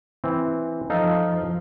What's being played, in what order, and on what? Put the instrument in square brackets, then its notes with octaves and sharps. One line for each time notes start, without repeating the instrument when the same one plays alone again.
[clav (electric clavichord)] E3 C4
[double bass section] F2 F3 [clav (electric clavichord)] D#4 A4 F5